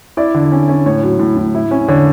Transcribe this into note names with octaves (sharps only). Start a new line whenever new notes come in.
E4 D5
D3
C#4
C#4
A2 C#5
F#3
A2
A2
E4
C#4
D3 C#5